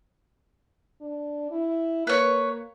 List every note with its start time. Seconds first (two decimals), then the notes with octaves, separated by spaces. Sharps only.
1.01 D4
1.51 E4
2.07 A#3 B4 C#5